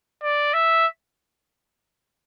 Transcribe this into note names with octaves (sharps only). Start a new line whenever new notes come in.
D5
E5